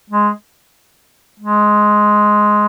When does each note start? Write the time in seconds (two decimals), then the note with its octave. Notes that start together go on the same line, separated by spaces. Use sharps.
0.10 G#3
1.39 G#3